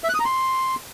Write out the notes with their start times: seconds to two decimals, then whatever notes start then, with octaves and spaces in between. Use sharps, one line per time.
0.04 E5
0.09 F#6
0.14 D#6
0.20 A#5
0.25 C6